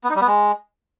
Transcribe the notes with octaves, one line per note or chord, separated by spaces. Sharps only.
B3
D#4
G3
B3
G#3